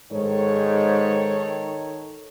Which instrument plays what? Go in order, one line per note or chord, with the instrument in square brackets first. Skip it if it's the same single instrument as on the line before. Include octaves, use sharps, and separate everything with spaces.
[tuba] G#2 [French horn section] D#3 A4 C#5